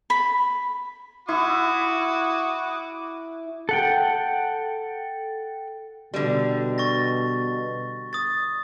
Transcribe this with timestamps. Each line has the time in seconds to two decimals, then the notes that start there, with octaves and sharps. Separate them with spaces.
0.10 B5
1.29 E4 F#4 D6 D#6
3.69 A4 F#5 G5
6.14 B2 D3 G3
6.78 C#6 A6 A#6
8.13 D#6 A6